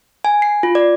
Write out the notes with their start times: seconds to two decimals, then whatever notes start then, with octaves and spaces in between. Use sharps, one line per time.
0.25 G#5
0.42 C7
0.63 F4
0.75 D5